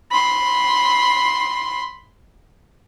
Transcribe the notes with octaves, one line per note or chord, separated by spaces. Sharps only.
B5 C6